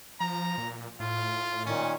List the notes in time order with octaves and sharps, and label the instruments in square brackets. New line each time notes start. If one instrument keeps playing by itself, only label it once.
[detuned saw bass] F3 [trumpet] A#5
[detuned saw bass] A#2
[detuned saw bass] A2 [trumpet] F4
[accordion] A#2 D#3 [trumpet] C#4